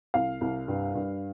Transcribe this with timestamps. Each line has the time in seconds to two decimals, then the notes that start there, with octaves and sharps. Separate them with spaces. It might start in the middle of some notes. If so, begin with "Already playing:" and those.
0.14 C2 F5
0.41 C2
0.68 G2
0.95 G2